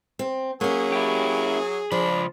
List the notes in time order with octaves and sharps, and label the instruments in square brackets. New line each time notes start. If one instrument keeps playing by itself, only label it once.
[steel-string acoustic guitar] C4
[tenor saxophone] F#3 [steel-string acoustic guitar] A#3 C#4 [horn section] G#4
[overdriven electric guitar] E4 G4
[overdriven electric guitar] C#2 B5 [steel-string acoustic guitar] F3 [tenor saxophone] D4